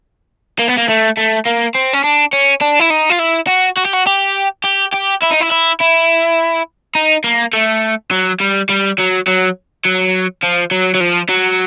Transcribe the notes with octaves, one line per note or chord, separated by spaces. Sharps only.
A#3
B3
A#3
A3
A3
A#3
C4
C#4
D4
C#4
D4
E4
D#4
F4
E4
F#4
F#4
G4
F#4
G4
G4
G4
E4
D#4
E4
E4
E4
D#4
A#3
A3
F#3
G3
G3
F#3
F#3
F#3
F3
F#3
F#3
F3
F#3